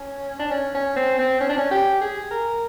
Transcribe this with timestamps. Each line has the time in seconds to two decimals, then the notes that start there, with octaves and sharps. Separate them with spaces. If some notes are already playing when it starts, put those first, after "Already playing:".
Already playing: C#4
0.39 D4
0.51 C#4
0.74 C#4
0.96 C4
1.19 C4
1.40 C#4
1.49 D4
1.57 C#4
1.71 G4
2.01 G#4
2.31 A#4